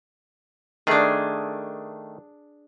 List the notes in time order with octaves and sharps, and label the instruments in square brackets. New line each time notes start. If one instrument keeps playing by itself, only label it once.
[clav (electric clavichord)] D#3 A3 [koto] D4 G#4